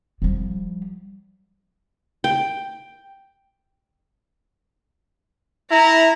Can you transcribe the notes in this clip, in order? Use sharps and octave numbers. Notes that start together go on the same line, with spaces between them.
F3 G3
G5
E4 A#5